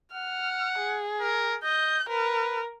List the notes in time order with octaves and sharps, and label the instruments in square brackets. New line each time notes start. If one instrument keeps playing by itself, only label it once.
[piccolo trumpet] F#5 [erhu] F6
[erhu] G#4
[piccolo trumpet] A#4
[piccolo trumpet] D#5 [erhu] G6
[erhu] A#4 [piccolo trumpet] B4